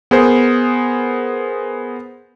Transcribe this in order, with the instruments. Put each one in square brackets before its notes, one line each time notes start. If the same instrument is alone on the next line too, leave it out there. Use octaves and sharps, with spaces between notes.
[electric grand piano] B3 G#4 A#4 C5